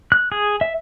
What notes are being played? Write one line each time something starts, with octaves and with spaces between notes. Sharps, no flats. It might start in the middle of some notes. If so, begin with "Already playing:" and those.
F#6
G#4
E5